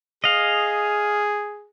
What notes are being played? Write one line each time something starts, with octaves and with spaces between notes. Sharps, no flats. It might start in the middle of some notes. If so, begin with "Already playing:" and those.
G#4 D#5 F5